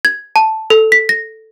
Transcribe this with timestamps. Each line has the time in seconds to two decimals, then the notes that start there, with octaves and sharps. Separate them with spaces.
0.05 G#6
0.36 A5
0.70 A4
0.92 B6
1.09 A#6